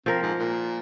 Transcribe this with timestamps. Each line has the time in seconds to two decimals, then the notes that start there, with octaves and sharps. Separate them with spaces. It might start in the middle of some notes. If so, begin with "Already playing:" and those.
0.06 F3 C4 A#4
0.23 G#2
0.39 A#2